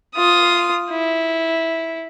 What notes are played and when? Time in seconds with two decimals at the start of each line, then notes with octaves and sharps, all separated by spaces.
0.16 F4 D#6
0.90 E4